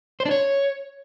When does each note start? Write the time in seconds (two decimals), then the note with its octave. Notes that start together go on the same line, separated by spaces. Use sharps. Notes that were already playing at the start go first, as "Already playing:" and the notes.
0.20 C5
0.26 D4
0.31 C#5